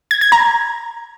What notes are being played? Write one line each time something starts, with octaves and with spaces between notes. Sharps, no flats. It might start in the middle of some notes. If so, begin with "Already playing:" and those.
G#6
G#6
A#5